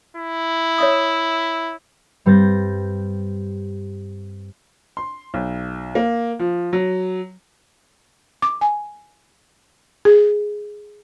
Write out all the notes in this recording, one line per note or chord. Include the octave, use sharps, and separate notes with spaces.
E4
C#5 E5 D#6
G2 G3 C4 G6 A6 A#6
C6
B1
A#3
F3
F#3
D6
G#5
G#4